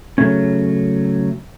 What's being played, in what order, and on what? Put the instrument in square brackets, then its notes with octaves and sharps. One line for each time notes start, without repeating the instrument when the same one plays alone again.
[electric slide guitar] C#3 E3 F#3 A3 C#4